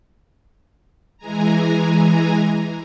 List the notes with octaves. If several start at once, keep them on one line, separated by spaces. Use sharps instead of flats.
E3 G#3 G#5 A#5